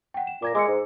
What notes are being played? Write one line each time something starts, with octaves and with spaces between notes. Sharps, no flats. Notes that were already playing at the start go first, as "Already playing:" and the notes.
F#5 G5
E7
A#2 D6 G#6 A#6
G#3 D6 E6 C#7
G#2